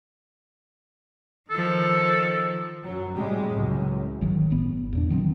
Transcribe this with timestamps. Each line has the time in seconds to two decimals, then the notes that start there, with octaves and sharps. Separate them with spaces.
1.50 D#3 F3 A4
2.84 F#2 F#3
3.16 A2 C3 G3 G#3
3.50 C#2 F#2 A2
4.21 G#1 D#3 F#3
4.50 G1 A2 B3
4.93 E2 A#2 D4
5.09 D3 D#3 F#3 C4